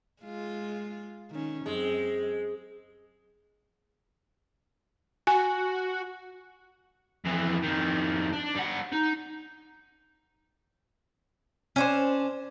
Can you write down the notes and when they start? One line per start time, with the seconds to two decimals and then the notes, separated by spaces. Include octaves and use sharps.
0.23 G#3 F4
1.31 D#3 C#4
1.66 F#2 G#3 C4
5.27 F#4 G#5
7.25 F2 E3
7.63 F2 D#3
8.33 D4
8.55 G3 F#5
8.93 D#4
11.76 C#4 D4 C5